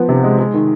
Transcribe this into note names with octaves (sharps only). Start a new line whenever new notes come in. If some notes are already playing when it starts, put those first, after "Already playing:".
Already playing: F3 B3
C3
G#3
G#3
D#3